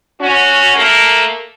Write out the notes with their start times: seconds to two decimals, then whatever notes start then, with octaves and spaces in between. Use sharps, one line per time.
0.20 C#4 F#4
0.75 A3 A#3 A#4